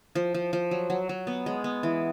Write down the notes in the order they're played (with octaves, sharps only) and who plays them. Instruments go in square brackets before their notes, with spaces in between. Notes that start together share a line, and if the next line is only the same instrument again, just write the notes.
[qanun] F3
F3
F3
F#3
F#3
F#3
B3
G#3
B3
E3